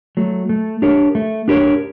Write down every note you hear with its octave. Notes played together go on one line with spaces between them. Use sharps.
F#3 A3
A3
D4 G4 A#4 C#5
A3
D4 G4 A#4 C#5